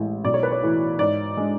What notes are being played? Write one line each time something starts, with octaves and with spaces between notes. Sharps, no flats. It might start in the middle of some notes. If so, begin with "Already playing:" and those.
Already playing: A1 A2 G#3
B1 D5
C#5
B4
C#5
A2 E3
G#2 D5
G#3 D4